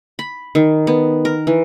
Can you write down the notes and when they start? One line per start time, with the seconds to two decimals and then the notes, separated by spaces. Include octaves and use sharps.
0.19 B5
0.55 D#3
0.87 B3
1.25 A#4
1.47 E3